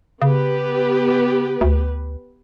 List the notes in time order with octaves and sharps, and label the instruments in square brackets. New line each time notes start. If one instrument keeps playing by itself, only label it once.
[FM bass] C#3 [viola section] B3 G4 B4
[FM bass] D2